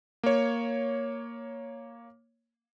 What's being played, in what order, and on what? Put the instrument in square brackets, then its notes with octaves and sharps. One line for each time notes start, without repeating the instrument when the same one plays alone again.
[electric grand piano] A#3 C#5